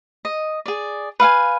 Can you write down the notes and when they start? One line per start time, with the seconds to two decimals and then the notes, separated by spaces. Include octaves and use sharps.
0.25 D#5
0.66 G#4 D5
1.20 B4 F5 F#5 G#5